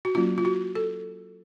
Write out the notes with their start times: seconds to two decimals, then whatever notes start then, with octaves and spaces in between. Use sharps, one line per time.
0.05 F#4
0.15 F#3 A#3 C#4 F4
0.38 F4
0.45 F#4
0.75 A4